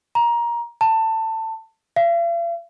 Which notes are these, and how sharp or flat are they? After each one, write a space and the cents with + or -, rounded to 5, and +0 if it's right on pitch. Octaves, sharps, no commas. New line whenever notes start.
A#5 +20
A5 +20
F5 -45